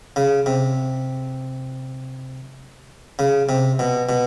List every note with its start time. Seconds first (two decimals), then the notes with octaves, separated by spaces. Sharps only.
0.16 C#3
0.46 C3
3.19 C#3
3.49 C3
3.79 B2
4.09 B2